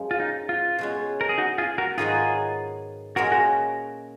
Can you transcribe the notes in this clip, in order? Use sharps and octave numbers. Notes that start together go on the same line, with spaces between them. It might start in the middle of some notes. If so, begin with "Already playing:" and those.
Already playing: F#2 F3 G#3
F4
D#4
F4
B2 G#3 C#4
A#4
G#4
D#4 F#4
F4 G#4
F#4 A#4
G#2 D#3 F#3 B3 D#4 F4 G#4
A#2 G#3 C#4 F#4 G#4 A#4
F#4 A#4